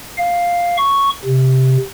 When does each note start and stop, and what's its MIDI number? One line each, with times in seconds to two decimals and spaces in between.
0.18 0.77 77
0.77 1.09 85
1.25 1.77 48